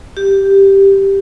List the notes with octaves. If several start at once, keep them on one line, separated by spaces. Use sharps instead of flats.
G4